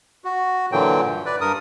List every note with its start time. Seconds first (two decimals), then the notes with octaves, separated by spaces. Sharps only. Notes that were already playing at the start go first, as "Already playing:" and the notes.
0.24 F#4
0.72 A#2 D3 E3 F#3 G5
1.04 G2
1.26 B4 D5
1.41 G2 A#4 D#6